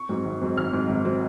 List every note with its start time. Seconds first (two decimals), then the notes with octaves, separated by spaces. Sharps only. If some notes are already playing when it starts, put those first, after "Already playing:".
Already playing: C#6
0.09 G#2 F#3 C4
0.25 G#1
0.41 G#2 F#3 C4
0.57 G#1 F6
0.73 G#2 F#3 C4
0.89 G#1
1.05 F#3 C4